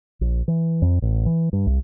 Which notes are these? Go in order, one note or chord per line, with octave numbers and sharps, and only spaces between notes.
A#1
E3
F2
A1
E3
G2
C2